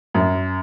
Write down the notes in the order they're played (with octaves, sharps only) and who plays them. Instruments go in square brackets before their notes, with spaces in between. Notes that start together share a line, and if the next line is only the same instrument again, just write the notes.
[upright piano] F#2